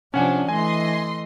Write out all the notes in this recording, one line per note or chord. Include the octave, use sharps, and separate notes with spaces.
C3 F3 C#4 D4 F#5 G#5
E3 A3 D#5 G#5 C6